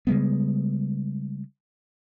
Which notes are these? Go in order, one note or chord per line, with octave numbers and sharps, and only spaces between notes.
C#3 G3 G#3 B3